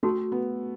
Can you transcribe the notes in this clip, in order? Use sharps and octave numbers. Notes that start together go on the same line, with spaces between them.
A3 C#4 F#4 A4
B3